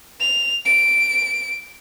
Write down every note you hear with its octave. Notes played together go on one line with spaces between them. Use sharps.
F7
D7